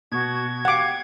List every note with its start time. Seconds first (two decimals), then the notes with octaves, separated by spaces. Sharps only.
0.12 B2 F#4 C#6 G#6
0.65 G4 F5 F#5 D6